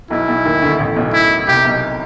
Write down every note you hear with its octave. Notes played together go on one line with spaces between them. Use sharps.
B1 B2 E4
B1 B2
D#2 D#3
D2 D3
A1 A2
B1 B2
E4
C2 C3 G4
B1 B2